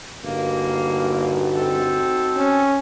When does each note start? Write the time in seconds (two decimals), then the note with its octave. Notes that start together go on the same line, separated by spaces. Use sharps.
0.24 G1 A#3 D#4 F#4
1.56 C4 A4
2.36 C#4